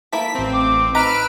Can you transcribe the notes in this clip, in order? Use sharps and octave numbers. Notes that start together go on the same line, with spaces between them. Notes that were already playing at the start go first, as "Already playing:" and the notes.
A#3 E4 A4 B6
A1 C4
D6
D#4 B4 A#5 E6 F6 D7